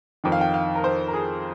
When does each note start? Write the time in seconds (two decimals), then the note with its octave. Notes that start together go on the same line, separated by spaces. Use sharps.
0.24 F2 D#3 G5
0.32 F5
0.41 G5
0.54 F5
0.75 A#4
0.84 C5
1.08 A#4
1.14 G#4